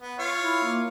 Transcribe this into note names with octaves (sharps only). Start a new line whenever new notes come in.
B3
F4 C#5 F5
E4
A#3